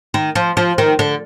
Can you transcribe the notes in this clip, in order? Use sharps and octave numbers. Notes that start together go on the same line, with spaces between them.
D#3
F3
F3
D#3
D3